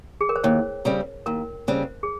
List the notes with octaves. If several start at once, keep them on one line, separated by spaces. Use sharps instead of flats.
G#4
A#4
C5
D#2 C#5
C#3 G3 C4
D#2 A#4
C#3 G3 C4 C5
G#4